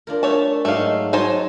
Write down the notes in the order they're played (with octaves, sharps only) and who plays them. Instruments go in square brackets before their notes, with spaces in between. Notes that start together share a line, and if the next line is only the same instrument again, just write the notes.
[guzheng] D4 F4 A#4
[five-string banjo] A3 C#5 A5 [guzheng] F#5
[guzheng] G#2 F#3 D#4 [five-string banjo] A3 F5
[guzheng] F#3 F#4 [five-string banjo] D#4 C5 A5